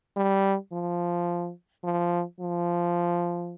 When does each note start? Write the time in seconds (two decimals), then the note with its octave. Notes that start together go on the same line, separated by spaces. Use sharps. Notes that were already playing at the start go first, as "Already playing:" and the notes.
0.17 G3
0.73 F3
1.84 F3
2.40 F3